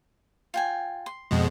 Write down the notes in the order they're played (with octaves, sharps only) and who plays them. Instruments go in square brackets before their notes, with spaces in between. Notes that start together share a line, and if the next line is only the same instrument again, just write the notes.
[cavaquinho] F4 G5 G#5
C6
[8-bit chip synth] F2 B2 G#3